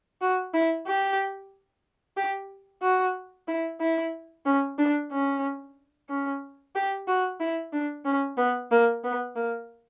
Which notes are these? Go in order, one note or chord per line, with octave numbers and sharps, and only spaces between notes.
F#4
E4
G4
G4
F#4
E4
E4
C#4
D4
C#4
C#4
G4
F#4
E4
D4
C#4
B3
A#3
B3
A#3